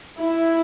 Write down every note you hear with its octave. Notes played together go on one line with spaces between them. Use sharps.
E4